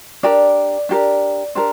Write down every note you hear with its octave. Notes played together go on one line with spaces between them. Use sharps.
D4 G4 A#4 D5
D4 G4 A#4
D4 G4 A#4 C5